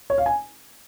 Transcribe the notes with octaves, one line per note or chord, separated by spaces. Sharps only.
C#5
F5
G#5